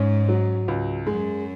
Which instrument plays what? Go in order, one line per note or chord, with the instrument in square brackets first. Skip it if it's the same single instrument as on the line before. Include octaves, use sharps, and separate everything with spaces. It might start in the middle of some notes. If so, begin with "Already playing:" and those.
Already playing: [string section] G#2 [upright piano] C#4
[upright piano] F#3
C#2
[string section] F#2 [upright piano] G#3